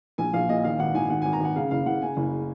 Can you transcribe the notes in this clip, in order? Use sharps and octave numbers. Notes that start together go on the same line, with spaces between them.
A#1 G#5
A#1 F5
A#2 D#5
D#3 F5
G#1 F#5
G#1 G#5
D#3 F#5
G#1 G#5
A#5
G#1 F#5
C#3 F5
F#1 F5
F#1 F#5
C#3 G#5
F#1